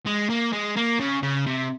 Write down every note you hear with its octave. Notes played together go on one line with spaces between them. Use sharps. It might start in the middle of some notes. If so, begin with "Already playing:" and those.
G#3
A#3
G#3
A#3
C#3
C#3
C3